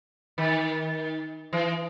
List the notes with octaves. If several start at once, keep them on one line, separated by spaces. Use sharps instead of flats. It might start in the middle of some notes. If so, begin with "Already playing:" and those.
D#3
E3